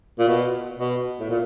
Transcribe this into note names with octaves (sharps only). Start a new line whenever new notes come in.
A#2
B2
B2
A2
A#2